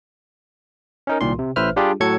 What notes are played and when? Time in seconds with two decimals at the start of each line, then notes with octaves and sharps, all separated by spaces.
1.07 C#4 D#4 A#4
1.21 C2 A#2 D#3 C6
1.39 C3
1.56 A1 A2 B4 C5 E5 F6
1.76 G3 D4 F4 G4 G#4
2.00 A2 F#3 F#4 A4 G#6 C#7